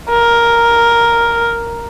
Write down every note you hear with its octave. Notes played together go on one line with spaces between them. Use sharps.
A#4